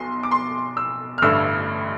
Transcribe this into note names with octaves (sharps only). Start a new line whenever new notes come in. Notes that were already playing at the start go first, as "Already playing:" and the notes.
Already playing: B1 B2 C6
D6
C6
E6
F6
A1 G2 D3 A3 E6